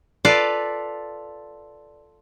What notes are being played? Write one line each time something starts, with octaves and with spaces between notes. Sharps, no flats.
F4 A4 B4 D5 F5